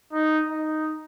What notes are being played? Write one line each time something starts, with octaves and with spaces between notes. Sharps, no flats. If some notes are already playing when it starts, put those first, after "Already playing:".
D#4
D#4